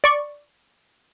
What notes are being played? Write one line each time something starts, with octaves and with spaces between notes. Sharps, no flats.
D5 C#6